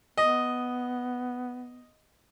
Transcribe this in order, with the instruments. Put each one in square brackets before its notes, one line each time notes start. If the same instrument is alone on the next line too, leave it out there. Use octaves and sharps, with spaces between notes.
[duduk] B3 [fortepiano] D#5